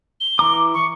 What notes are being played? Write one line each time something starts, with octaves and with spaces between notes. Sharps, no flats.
G7
E3 A#5 D6
C#6